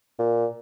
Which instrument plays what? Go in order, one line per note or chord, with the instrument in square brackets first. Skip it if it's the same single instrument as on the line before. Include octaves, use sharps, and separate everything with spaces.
[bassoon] A#2